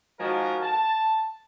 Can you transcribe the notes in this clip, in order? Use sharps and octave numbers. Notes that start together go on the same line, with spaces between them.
D#3 F3 G#3 F#4 A#4
A5